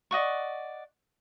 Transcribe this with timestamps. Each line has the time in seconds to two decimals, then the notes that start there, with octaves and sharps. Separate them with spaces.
0.11 D5 D#5 F#5 C#6